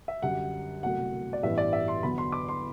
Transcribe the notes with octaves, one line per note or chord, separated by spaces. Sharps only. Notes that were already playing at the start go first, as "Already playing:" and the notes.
E5
F#2 D3 G3 F#5
C2 B2 F#3 A3 F#5
D5
A1 G2 E3 G3 B3 E5
D5
E5
C6
E2 D3 F#3 B3 B5
C6
D6
C6